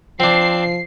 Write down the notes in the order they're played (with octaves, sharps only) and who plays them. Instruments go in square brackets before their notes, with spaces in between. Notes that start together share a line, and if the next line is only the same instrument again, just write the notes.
[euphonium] F3 [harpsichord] C4 D4 [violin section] C7